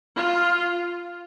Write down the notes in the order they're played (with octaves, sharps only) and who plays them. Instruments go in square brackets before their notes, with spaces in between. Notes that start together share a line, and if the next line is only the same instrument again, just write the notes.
[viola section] F4